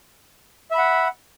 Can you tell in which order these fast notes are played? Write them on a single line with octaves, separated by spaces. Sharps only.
E5 B5 F#5